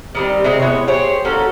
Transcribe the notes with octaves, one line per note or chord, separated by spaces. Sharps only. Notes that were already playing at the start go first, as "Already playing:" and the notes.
D#3 G3 C4
C3 G#3 C4
G#3 B3 E4 C#5
G4 G#4 C5 C#5
A#3 C#4 F#4 A4